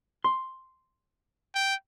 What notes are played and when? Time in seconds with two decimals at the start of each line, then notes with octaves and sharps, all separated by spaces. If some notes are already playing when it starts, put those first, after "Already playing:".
0.24 C6
1.55 G5